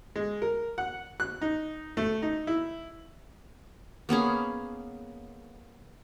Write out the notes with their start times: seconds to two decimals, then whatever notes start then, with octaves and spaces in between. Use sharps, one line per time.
0.16 G#3
0.42 A#4
0.78 F#5
1.20 F#6
1.42 D#4
1.97 A3
2.22 D#4
2.47 E4
4.09 A#3 B3 C#4 G#4